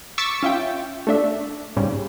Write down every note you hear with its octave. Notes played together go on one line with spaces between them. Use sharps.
C#6 D6 E6 A6 B6 C#7
C#4 F4 E5 G5
A3 D4 E5
G#2 C#3 G3